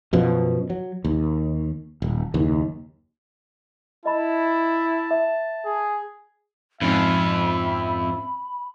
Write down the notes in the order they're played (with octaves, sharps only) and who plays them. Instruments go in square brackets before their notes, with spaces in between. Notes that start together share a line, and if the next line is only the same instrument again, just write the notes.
[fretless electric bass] F#2 B2 F3
F#3
D#2
D#1
F#1 D#2
[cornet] E4 [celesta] D#5 B5 [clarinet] A5
[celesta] E5
[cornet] G#4
[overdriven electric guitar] F2 F4 [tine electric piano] G#2 C4 C#4 [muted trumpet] E5 [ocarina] B5